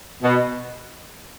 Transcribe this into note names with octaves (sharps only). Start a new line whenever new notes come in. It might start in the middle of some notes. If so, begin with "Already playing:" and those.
B2